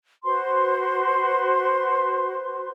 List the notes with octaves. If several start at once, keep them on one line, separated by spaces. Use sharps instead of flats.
F#4 B4 C5 C6